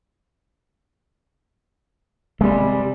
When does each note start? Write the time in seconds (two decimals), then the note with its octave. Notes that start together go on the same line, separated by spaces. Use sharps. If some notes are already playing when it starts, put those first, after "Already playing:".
2.41 C3 G3 G#3 B3